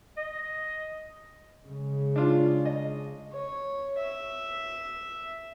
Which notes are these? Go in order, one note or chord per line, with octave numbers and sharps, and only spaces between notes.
D#5
C#3 G#3
D4 F4
D#5
C#5
E5